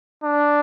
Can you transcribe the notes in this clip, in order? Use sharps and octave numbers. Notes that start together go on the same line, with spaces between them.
D4